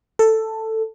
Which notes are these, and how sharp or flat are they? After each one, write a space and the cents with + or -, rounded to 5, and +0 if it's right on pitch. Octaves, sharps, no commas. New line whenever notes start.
A4 +10